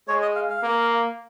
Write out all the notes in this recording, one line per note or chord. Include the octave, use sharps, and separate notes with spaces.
G#3 C#5
D#5
F5
F5
A#3